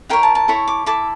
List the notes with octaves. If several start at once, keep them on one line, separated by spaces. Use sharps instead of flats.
E4 A#4 C#5 G5
A5
A5
E4 A4 C#5 C#6
D6
E4 A4 D6